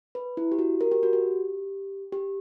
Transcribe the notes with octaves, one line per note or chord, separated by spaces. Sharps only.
B4
E4
G4
F#4
A#4
G4
F#4
G4
G4